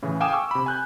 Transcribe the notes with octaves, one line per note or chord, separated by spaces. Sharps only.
A2 C#3 E3
F5 G5 G#5 D6 D#6 E7
C#6 D6 E6
C3 B5
G#5 F#6 G6